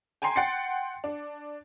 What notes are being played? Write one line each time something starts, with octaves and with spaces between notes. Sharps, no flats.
G5 G#5 A#5 C6 C7
F#5 G5 C6 A6 C7 C#7
D4